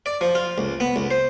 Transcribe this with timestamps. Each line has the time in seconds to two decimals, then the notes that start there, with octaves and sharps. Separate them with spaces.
0.06 D5
0.21 F3
0.35 F4
0.58 C#2
0.80 B3
0.96 C#2
1.11 C5